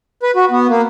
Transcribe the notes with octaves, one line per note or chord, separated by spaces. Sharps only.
B4
F#4
B3
A#3